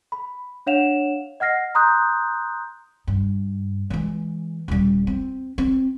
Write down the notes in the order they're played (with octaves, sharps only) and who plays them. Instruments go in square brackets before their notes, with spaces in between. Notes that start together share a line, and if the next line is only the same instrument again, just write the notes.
[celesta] B5
D4 C#5 F5 F#5 E7 F7
D#5 F#5 F6 A#6 C7
A#5 C6 D#6 F#6 G6
[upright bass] G2
E3 G#3
D#1 G3
C4
C4